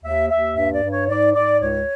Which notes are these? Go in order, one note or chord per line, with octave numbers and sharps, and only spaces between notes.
D#2 E5
D#2 E5
G2 E5
D5
G2
C#5
G#2 D5
G#2 D5
C#2 C#5